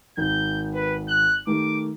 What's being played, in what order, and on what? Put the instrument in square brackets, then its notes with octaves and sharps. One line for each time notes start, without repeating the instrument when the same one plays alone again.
[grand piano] G#1 D#3 [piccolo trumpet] G6
[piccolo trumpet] B4
F#6
[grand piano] D#3 A3 G4 [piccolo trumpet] D6